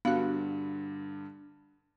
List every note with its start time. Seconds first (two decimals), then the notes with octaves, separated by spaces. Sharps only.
0.05 G2 D3 B3 F#4 F5